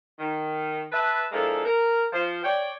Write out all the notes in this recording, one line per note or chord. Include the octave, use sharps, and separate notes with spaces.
D#3
B4 E5 A5
F3 G#3 A#3 D4 E4 A4
A#4
F3 C5
C#5 D5 G5